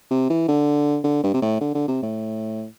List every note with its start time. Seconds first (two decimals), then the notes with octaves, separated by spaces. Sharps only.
0.11 C3
0.30 E3
0.48 D3
1.04 D3
1.24 G2
1.34 C3
1.42 A2
1.61 D3
1.75 D3
1.88 C3
2.03 A2